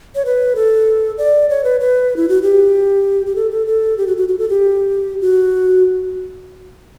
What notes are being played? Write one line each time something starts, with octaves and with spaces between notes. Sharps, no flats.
C#5
B4
A4
D5
C#5
B4
B4
E4
F#4
G4
G4
A4
A4
A4
G4
F#4
F#4
F#4
A4
G4
F#4